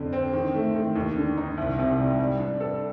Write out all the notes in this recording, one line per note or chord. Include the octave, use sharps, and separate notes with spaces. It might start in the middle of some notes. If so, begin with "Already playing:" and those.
Already playing: F2 D3
C4
D#3
A3
D#3
D#2
D3
D#4
C2
C3
G3
G3
D4
A4